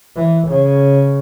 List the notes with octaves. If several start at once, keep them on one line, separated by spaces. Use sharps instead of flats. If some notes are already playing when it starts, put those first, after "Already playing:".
E3
C#3